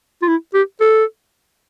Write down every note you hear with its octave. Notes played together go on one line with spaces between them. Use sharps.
F4
E4
G4
A4